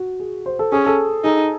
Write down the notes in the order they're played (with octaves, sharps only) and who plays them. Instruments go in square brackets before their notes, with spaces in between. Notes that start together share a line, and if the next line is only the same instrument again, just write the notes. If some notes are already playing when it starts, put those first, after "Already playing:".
Already playing: [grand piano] F#4
G#4
C5
A4
[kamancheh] C#4 [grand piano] G#4
[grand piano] A4
[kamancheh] D#4 [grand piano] G#4